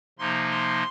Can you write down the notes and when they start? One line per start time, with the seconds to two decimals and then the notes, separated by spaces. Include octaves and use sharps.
0.19 C3 F3 A#3 D#4 C6
0.51 C6